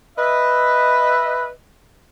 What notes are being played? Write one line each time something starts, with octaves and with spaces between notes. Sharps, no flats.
B4 D#5 E5